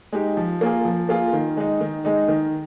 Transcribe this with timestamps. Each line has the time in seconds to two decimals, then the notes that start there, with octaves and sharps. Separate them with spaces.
0.13 G#3 D#4 G4
0.37 F3
0.61 A#3 F4 G#4
0.85 F3
1.09 A#3 F4 G#4
1.33 D#3
1.57 G#3 D#4
1.81 D#3
2.05 G#3 D#4
2.28 D#3